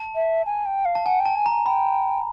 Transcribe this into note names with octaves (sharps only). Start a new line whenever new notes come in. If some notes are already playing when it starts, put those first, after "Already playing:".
Already playing: A5
E5
G#5
G5
F5
A5
F#5 G#5
G5
A5
G#5
G#5 A#5
G5 B5